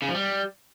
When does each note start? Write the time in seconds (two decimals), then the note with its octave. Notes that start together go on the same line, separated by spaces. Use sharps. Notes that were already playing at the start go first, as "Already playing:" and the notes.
0.02 C#3
0.08 F3
0.14 G3